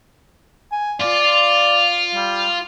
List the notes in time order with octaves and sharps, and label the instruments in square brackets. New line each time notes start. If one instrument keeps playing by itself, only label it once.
[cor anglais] G#5
[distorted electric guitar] F4 [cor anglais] D5
[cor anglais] G3